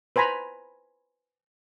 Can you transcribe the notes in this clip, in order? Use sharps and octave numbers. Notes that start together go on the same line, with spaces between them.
B4 C5 G#5 A#5 B5